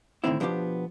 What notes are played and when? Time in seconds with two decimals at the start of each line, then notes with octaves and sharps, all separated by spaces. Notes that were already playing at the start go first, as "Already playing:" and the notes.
0.24 A2 D3 D#3 C4 E4
0.40 B2 F3 B3 D4 D#4 G4